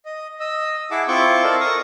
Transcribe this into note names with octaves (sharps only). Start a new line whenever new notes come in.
D#5
D#5 E6
E4 G#4 E5 F#5 A5 D6
C4 E4 F4 C#6 D6 G6
A4 A#4 C5 D5 D#5 A5
A#4 C#6 D#6